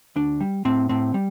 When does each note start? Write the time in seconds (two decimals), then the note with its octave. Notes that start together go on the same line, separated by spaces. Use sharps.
0.16 D2 D4
0.41 G3
0.65 A2 C4
0.89 A2 C4
1.14 G3